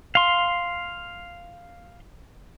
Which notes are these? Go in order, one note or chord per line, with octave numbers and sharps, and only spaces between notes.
F5 C6